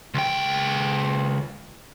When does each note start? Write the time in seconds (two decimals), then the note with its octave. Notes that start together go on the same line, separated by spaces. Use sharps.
0.14 C#2 G5